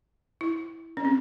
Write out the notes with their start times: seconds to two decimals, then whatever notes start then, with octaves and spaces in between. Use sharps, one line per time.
0.41 E4
0.97 C#4
1.05 C4